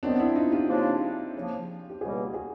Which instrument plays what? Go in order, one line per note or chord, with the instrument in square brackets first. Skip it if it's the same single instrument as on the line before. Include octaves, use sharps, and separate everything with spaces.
[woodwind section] D#3 F#3 B3 [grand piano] C4 D4
[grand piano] D4 E4
D#4 F4
F4 G4
[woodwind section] C#3 F3 A#3 D4
C#3 F3 A#3
[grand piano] G4
[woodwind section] C#2 B2 G3 A#3 [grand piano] F#4 G#4
[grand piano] F#4 G#4